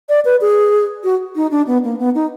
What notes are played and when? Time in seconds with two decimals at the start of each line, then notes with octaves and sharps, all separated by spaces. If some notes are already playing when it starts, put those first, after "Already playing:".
0.09 D5
0.25 B4
0.41 G#4
1.04 F#4
1.36 D#4
1.51 D4
1.67 B3
1.84 A#3
1.99 B3
2.15 D#4